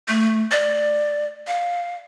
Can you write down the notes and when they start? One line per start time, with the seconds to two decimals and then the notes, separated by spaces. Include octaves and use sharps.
0.08 A3
0.51 D5
1.47 F5